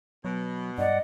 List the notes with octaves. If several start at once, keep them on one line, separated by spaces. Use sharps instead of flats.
B2 F#3
G2 D5 D#5 F#5